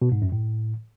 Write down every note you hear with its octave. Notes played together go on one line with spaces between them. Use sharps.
B2
G#2
F#2
A2